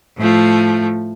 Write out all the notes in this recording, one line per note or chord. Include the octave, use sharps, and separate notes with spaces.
A2 F3 A3